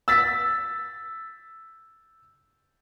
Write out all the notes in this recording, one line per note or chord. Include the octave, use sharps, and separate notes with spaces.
E6 A6 B6